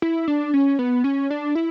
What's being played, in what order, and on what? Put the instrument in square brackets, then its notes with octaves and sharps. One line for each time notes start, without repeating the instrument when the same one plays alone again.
[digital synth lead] E4
D4
C#4
B3
C#4
D4
E4